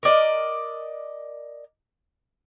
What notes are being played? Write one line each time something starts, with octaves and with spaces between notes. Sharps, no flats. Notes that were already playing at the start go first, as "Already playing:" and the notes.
A#4 D5 D#5